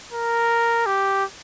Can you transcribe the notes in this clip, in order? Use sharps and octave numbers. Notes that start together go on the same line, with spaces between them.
A#4
G4